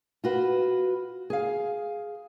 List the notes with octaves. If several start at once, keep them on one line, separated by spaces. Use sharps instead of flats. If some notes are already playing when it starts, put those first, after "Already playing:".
F4 F#4 B4
G#4 F5